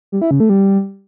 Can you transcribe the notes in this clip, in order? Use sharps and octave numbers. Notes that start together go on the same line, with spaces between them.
G3
E4
C#3
A3
G3